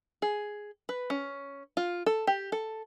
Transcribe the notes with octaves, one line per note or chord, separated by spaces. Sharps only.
G#4
B4
C#4
F4
A4
G4
A4